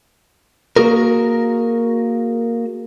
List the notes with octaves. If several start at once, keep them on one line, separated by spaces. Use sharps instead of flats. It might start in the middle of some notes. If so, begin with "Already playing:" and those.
A#3 F#4 G#4 A#4